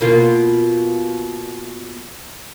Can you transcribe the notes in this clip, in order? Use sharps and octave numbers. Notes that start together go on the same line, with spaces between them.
B2 A#3 F4